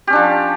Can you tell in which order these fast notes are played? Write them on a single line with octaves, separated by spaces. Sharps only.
G4 C#4 D4 F3